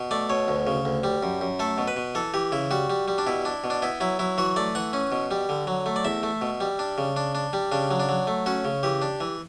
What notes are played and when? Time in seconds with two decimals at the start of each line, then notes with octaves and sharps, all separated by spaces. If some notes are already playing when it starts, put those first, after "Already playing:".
Already playing: B2
0.11 A3 D5
0.30 B2 C#5
0.48 D2
0.67 C#3
0.85 D2
1.04 G3
1.23 F#2
1.41 F#2
1.59 A3 A4
1.78 B2
1.88 B4
1.96 B2
2.15 E3 A4
2.34 E3 G4
2.52 C#3 E4
2.71 G3 F#4
2.90 G3
3.08 G3
3.18 D4
3.27 B2 E4
3.45 D4
3.64 B2
3.70 D4
3.82 B3 E4
4.01 F#3 E4
4.19 F#3 E4
4.38 E3 F#4
4.56 A3 D5
4.75 E3 F#5
4.93 C#4
5.12 B2
5.31 G3
5.49 D3
5.67 F#3
5.86 A3
5.96 D5
6.05 E2 E5
6.23 A3
6.42 B2
6.61 G3
6.79 D4
6.98 C#3
7.16 D4
7.35 D4
7.53 G3
7.72 C#3 D4
7.91 F#3
8.00 D4
8.09 F#3
8.27 A3
8.46 C#4 F#4
8.65 C#3
8.83 E3 G4
9.02 D4
9.20 E3